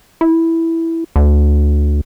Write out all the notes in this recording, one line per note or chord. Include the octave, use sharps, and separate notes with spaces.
E4
D2